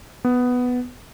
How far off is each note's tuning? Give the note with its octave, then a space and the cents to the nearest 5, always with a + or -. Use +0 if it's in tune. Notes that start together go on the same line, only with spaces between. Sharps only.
B3 +5